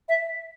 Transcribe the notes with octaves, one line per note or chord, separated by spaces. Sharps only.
E5